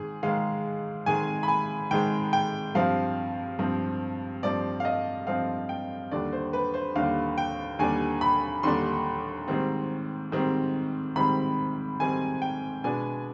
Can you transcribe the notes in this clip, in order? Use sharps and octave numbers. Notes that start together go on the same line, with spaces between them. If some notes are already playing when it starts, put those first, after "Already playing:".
Already playing: G#2 D#3 G#3 G#4
G#2 D#3 G#3 F5
G#2 D#3 G#3 G#5
B5
G#5
G#2 D#3 G#3 G5
G5
G2 F3 C4 F5
G2 F3 C4
G2 F3 C4 D5
F5
D#5
G2 F3 C4 F5
G5
D#2 D3 G3 D4 D5
C5
B4
C5
D#2 D3 G3 D4 F5
G5
D#2 D3 G3 D4 G#5
B5
D#2 D3 G3 D4 C6
G#2 D#3 G3 C4
G#2 D#3 G3 C4
G#2 D#3 G3 C4 B5
G#2 D#3 G3 C4 G#5
G5
B2 G#3 B3 D4 G#5